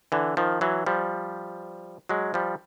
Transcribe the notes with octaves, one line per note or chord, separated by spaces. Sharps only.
D3 E3
D#3 F3
E3 F#3
F3 G3
F#3 G#3
F3 G3